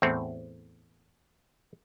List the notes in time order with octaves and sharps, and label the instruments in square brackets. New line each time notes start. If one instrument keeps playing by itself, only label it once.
[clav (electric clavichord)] E2 A2 C4